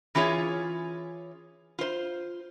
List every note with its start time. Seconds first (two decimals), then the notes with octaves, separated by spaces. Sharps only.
0.15 E3 C#4 F4 G#4 C#5
1.79 F4 C5